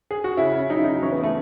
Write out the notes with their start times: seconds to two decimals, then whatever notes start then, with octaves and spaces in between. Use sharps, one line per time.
0.11 G#4
0.24 F#4
0.37 C#3 E4
0.53 C#3
0.70 F#3 D#4
0.77 E4
0.84 F#3 D#4
1.02 E3 C#4
1.12 B3
1.18 C#3
1.23 A3